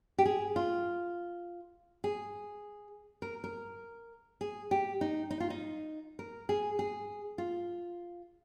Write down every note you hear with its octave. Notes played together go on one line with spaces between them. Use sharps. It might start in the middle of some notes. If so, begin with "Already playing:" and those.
G4
G#4
F4
G#4
A#4
A#4
G#4
G4
D#4
D#4
F4
D#4
A#4
G#4
G#4
F4